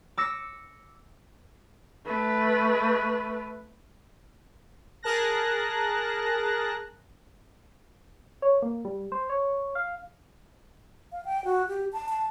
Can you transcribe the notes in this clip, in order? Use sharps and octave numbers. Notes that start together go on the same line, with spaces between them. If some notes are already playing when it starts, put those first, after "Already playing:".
D6 E6 A#6 C#7
A3 B4
G#4 A#4 A5 F#6 A#6
C#5
A#3
G3
C5
C#5
F5
F5
G5
F#4
G4
A5
A5